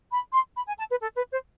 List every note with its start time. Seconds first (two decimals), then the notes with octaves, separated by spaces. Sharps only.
0.11 B5
0.33 C6
0.57 B5
0.67 G#5
0.78 A5
0.90 B4
1.01 A4
1.16 B4
1.31 C5